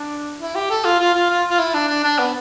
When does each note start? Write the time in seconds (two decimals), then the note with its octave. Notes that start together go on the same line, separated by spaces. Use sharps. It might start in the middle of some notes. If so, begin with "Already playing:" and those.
Already playing: D4
0.40 E4
0.55 G4
0.70 A4
0.85 F4
1.00 F4
1.14 F4
1.30 F4
1.49 F4
1.59 E4
1.74 D4
1.89 D4
2.04 D4
2.19 B3